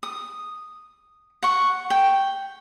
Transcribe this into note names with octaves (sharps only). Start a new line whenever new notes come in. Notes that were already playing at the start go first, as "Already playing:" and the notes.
D#6
F#5 C#6
G5